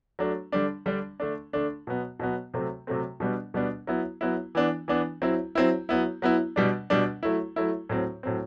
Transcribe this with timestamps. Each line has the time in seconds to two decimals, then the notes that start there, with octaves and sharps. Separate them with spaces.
0.19 F#3 A3 D4
0.52 D3 G3 D4
0.86 D3 G3 D4
1.20 D3 A3 D4
1.53 D3 A3 D4
1.87 B2 F#3 B3
2.19 B2 F#3 B3
2.54 C3 F#3 A3 C4
2.87 C3 F#3 A3 C4
3.20 B2 G3 B3 D4
3.54 B2 G3 B3 D4
3.87 F#3 B3 E4
4.21 F#3 B3 E4
4.55 E3 B3 D4
4.88 E3 B3 D4
5.22 F#3 C4 E4
5.55 F#3 C4 E4
5.89 F#3 B3 E4
6.22 F#3 B3 E4
6.56 B2 G3 D4
6.90 B2 G3 D4
7.23 F#3 A3 E4
7.56 F#3 A3 E4
7.89 A2 F#3 C4
8.23 A2 F#3 C4